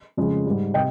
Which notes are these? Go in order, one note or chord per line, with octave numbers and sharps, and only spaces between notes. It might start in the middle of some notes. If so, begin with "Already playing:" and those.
F2 C#3 G#3
G#2 G3
C3 D#5 G5